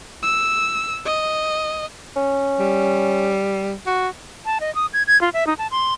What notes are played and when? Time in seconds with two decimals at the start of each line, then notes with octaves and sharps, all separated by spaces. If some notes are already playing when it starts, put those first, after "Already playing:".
0.23 E6
1.05 D#5
2.16 C#4
2.60 G3
3.86 F#4
4.46 A5
4.60 D#5
4.75 D#6
4.93 G#6
5.07 G#6
5.21 F4
5.33 E5
5.47 D#4
5.58 A5
5.71 C6